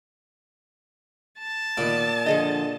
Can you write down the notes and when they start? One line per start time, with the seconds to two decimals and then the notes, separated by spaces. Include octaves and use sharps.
1.38 A5
1.77 A#2 D#3 B3 D5
2.26 D3 F3 G#4 D#5